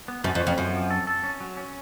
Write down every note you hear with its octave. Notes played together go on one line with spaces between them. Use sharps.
B3
F#2 A3
F2
C#4
F2
F#2 F3
F3
A4
A4
C#4
F#3
C#4